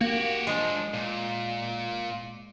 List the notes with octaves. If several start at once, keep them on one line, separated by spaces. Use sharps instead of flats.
A#3 F#4 G4
F3 G#3 D4
A#2